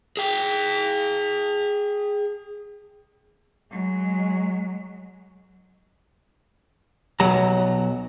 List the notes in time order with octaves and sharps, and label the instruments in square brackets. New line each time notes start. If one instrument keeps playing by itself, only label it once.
[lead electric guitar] G#4 G5
[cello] F#3 G#3
[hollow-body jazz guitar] B1 F#3 A#5